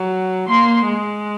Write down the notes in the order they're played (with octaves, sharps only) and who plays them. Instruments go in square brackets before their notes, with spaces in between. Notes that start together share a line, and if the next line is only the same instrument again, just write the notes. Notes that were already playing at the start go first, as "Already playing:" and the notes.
Already playing: [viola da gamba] F#3
[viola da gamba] A#3 [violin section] C6
[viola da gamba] G#3